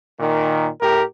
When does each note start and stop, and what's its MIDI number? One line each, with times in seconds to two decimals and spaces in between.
0.19 0.67 46
0.19 0.67 51
0.81 1.03 45
0.81 1.03 67
0.81 1.03 70